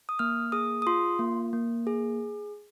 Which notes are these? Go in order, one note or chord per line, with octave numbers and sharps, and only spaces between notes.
D#6
A#3 F6
G#4 D#6
D#6
F4 C6
A#3
A#3
G#4